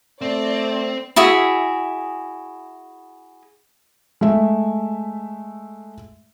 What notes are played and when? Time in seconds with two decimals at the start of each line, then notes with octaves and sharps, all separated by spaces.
0.22 A3 C4 D5
1.16 E4 F#4 G#4 E5
4.21 G#3 A3 E5